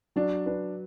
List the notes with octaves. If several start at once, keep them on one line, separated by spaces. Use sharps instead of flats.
F#3 D4
D4 B4